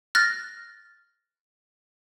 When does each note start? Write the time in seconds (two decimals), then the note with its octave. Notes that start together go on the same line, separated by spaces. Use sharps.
0.15 F6 F#6 A6 A#6